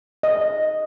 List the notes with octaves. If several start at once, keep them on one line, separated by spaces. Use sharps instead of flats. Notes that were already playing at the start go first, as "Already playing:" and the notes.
D#5